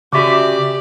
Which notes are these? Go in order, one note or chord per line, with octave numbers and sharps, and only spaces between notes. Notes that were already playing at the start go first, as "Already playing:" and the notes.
C#3 F#4 G4 D5 E5 C#6 D6